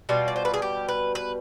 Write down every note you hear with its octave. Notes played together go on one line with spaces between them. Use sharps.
B2 G3 F4
D5
C5
B4
G#4
G4
B4
B4